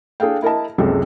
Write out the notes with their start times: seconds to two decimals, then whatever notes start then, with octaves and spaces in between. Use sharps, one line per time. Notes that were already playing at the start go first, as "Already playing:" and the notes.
0.20 D4 G#4 A4 F5 G5
0.42 E4 A#4 D#5 A5
0.78 F#1 C#2 C3 G#3 G4 A4